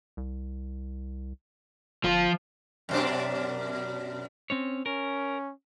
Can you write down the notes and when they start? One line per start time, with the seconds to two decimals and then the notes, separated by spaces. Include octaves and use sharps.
0.17 C2
2.04 G1 F3 F4
2.89 F#2 B2 D4
4.50 C4 C#4 C#5
4.86 C#4 A#4